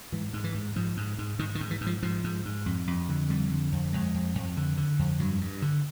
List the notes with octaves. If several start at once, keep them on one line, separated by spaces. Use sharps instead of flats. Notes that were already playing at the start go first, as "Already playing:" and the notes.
G#2 E3
G#2
E3
G#2
G#2 F3
G#2
G#2
G#2 D#3
D#3
G#2
E3
G#2
F3
G#2 F3
G#2
G#2
F2
F2
D3
F2 G3
D3
F2
F2 G#3
F2
F2
D3
D3
F2
G2 F#3
G2
D3